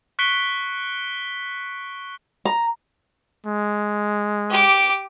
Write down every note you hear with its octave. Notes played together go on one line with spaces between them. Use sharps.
C#6 F#6 B6 C#7 D7 G7
A#5
G#3
G4 D6